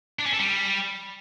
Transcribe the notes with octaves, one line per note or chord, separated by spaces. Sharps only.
D4
C#4
A4
G3